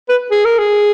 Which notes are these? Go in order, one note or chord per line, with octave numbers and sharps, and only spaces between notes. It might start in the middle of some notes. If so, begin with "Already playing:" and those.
B4
G#4
A#4
G#4